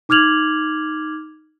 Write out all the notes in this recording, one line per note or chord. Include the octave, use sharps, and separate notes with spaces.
D#4 D6 F6 G#6 F7 F#7